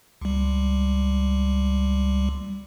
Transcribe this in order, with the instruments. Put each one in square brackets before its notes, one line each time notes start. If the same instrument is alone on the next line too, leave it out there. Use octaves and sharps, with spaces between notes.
[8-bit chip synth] C#2 G3